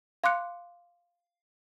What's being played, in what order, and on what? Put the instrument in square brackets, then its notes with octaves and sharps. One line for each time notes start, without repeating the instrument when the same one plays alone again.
[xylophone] F5 C6 D6 F#6 C#7